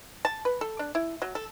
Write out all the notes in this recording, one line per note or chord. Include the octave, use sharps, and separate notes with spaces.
A5
B4
A4
D4
E4
F#3
A4